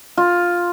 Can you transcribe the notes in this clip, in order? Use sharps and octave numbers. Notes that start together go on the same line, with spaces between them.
F4